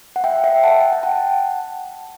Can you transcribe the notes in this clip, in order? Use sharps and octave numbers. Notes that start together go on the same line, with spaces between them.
F#5
E5 G5
E5 G5
F#5 A5
G5
F#5 A5